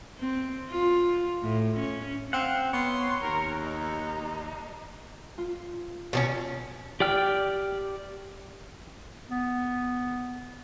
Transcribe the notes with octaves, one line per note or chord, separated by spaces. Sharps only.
C4
F4
A2
C#4
C4 F5 F#5
B3 C#5 C6
D#2 A#4
D#4
F4
B2 C4 C#4 A#4
G4 D5 G5 F6
B3